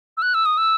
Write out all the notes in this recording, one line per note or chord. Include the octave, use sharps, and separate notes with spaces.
E6
F#6
E6
D#6
E6